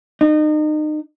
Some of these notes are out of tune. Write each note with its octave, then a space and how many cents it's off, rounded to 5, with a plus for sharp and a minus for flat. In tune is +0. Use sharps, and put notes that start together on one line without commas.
D#4 -30